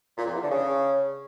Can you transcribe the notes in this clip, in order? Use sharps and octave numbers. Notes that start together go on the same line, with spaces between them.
A#2
F2
E2
D3
C#3